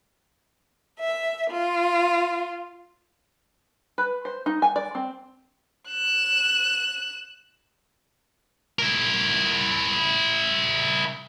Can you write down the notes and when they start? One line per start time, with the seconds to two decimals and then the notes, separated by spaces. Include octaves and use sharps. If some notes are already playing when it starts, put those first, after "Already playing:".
0.99 E5
1.50 F4
3.98 B4
4.25 C5
4.46 D#4
4.62 G#5
4.76 D5
4.95 C4
5.89 F#6 E7
8.79 E4 A#4